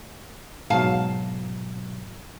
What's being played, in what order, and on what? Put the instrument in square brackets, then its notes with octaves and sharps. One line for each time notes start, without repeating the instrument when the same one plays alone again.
[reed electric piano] G#2 B2 F#3 [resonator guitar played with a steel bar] F5 A5